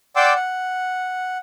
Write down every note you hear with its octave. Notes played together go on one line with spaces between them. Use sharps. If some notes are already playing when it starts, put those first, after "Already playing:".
D5 F#5 G5 C6 D6 E6
F#5